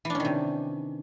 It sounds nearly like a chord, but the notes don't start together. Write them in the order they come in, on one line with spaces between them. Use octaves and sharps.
E3 D4 C#4 D#3 C3